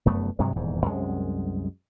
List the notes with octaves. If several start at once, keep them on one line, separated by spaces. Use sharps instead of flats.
F1 F#2 A3 B3
G2 C3 F#3 G#3
D#1 E2 G#2
C2 F#2 G#3